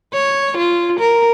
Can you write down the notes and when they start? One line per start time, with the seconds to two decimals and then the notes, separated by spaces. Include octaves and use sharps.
0.13 C#5
0.57 F4
0.99 A#4